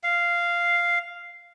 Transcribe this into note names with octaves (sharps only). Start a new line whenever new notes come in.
F5